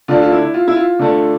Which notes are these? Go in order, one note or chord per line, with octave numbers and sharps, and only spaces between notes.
D3 A3 D4 F4
F4
E4
F4
E4
F4
D3 A3 D4